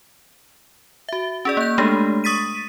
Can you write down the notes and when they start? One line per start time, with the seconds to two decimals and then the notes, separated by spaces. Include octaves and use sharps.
1.09 F#4 E5
1.45 C#4 G#4 D5
1.57 A#3 G6
1.78 G#3 A3 D4 G4 A4
2.24 C#6 D#6 A6 B6 D#7